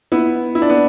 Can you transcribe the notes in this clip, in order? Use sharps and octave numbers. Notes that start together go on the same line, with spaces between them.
B3 E4
E4
D4
B3